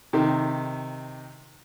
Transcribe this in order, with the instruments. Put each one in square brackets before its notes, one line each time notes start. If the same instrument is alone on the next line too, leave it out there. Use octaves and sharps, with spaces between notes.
[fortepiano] C3 D#3